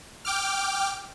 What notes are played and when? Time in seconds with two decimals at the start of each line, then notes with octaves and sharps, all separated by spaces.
0.25 G5 D6 F6